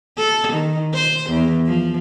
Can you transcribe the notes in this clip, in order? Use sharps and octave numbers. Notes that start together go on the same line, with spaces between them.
A4
D#3
C5
E2
F3